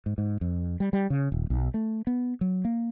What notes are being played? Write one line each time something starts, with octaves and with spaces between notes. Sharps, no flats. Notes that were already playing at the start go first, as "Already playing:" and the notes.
G#2
G#2
F2
G3
G3
C#3
D#1
B1
A3
B3
F#3
A#3